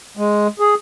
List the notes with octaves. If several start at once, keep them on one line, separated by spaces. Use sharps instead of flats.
G#3
G#4